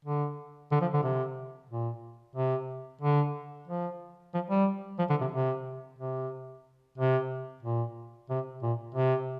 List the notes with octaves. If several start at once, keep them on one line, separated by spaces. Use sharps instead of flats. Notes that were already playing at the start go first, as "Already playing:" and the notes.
D3
D3
F3
D3
C3
A#2
C3
D3
F3
F3
G3
F3
D3
C3
C3
C3
C3
A#2
C3
A#2
C3